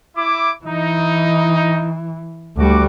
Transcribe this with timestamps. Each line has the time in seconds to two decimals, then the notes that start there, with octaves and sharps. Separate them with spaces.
0.16 E4 D6
0.65 E3 D#4
2.57 D2 G3 F#4 D6